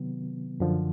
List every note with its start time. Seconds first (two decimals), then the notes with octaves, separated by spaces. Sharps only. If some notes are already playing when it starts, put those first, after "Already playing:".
Already playing: C3 D#3 F#3 B3
0.60 F#2 D3 F3